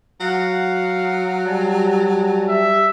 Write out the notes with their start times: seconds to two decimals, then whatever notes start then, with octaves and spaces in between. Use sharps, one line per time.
0.21 F#3 F5 F#5
1.46 G3 G#5 A5
2.48 E5